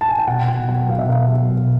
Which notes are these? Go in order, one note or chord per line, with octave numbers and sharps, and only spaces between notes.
A5
G#5
G5
B2 F#5
B2 G5
F#3 F#5
B2 F5
E5
B2 F5
F#3
B2